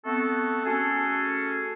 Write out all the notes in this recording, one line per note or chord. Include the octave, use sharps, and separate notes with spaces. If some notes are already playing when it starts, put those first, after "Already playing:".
A3 B3 C4 F#4 A4
A3 C#4 F#4 G#4 A4